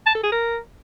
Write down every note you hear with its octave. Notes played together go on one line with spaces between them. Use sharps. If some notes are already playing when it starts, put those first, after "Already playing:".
A5
A4
G#4
A#4